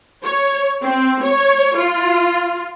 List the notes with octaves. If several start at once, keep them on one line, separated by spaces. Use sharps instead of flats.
C#5
C4
C#5
F4